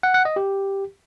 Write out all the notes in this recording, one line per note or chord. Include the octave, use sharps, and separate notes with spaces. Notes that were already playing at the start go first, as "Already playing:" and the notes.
F#5
F#5
D#5
G4